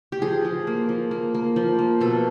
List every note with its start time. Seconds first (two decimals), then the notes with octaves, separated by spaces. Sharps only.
0.12 G4
0.22 F3 G#4
0.45 F3
0.67 A#3
0.89 F3
1.11 A#3
1.34 A#3
1.56 F3
1.79 A#3
2.01 B2 A4